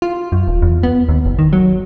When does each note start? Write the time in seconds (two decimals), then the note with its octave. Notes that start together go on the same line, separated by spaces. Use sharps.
0.02 F4
0.32 F#2
0.48 D#1
0.62 E2
0.83 B3
1.09 D#2
1.26 F#1
1.39 D#3
1.53 F#3